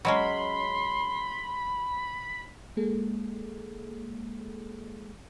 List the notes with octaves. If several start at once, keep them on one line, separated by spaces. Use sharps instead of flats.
F#3 G#3 C#4 B5 C6
G#3 A#3 G#4 A4